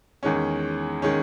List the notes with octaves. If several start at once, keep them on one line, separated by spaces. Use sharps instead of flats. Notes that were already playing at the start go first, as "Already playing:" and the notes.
E2 D#3 G#3 C#4
D#3 G#3 C#4